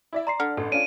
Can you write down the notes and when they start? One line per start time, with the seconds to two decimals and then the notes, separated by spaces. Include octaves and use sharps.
0.13 E4 D5 E5
0.27 D5 A#5 C6 C7
0.40 D3 F6
0.57 A1 A4
0.72 C#4 D4 F4 D7 D#7